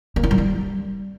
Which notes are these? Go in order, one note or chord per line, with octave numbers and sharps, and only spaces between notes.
A#3
E4
F#3
G3